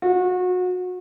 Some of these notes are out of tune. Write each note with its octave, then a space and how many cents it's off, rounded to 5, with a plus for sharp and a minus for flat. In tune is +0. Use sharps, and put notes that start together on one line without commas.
F#4 -30